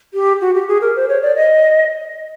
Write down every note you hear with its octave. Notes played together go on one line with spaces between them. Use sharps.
G4
F#4
G4
G#4
A#4
C5
C#5
D5
D#5